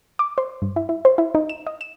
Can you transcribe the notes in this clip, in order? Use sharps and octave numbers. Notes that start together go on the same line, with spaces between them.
D6
C5
G2
E4
E4
C5
E4
D#4
E7
D#5
E7